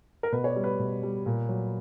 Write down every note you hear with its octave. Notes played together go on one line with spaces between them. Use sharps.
A#4
B2 B4
C#5
D5
G3
B4
B2
G3
A#2
F#3